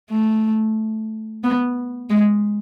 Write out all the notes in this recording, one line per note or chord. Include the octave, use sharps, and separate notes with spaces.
A3
B3
G#3